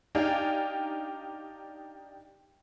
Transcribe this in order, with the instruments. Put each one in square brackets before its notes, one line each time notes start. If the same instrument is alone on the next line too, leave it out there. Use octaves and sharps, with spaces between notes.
[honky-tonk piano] D4 D#4 G4 F5 G5 G#5